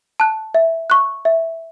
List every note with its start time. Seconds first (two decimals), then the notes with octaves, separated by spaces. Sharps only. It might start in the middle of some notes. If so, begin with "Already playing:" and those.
0.20 A5 F#6
0.55 E5
0.90 C#6 F#6
1.25 E5